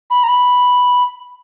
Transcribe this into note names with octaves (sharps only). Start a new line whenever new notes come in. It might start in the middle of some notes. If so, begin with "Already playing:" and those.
B5
A#5
B5